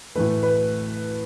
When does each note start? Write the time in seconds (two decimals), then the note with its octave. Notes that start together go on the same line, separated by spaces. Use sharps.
0.15 A2 E3 A3 B4
0.43 B4